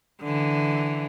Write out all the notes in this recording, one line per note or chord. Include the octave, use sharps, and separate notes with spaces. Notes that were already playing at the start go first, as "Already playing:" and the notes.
D3 E3